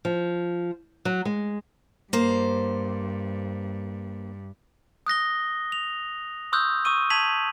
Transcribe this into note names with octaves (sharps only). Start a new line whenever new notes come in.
F3
F#3
G#3
G2 A#3 C5
D#6 F#6 A#6 G7
F7
C6 C#6 D#6 E6 F#6 G6
C#6 D#6 E6 D#7 G7
A5 G#6 B6 D#7 F7 F#7